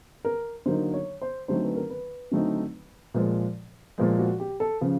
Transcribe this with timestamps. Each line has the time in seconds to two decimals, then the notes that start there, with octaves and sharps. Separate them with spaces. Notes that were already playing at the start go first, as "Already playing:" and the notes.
0.25 A#4
0.66 D3 F#3 A#3 D#4 C5
0.94 C#5
1.22 C5
1.48 D3 F#3 A3 C4 D#4 C5
1.62 B4
1.76 A#4
1.90 B4
2.32 D3 F#3 A3 C4 D#4
3.14 A#2 F3 G#3
3.98 A#2 F3 G#3
4.19 F#4
4.40 G4
4.60 A4
4.81 C#3 F3